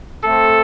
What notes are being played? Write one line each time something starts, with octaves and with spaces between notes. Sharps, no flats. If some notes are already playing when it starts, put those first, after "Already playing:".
A3 C4 A4